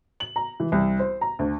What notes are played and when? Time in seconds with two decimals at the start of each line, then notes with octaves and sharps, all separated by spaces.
0.20 F#7
0.36 A#5
0.60 E3
0.72 C2
0.99 C5
1.21 A#5
1.39 D2